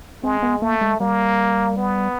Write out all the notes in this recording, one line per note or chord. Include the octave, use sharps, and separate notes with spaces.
G#3 C4
B3
A3 A#3
G#3
G3 A#3
B3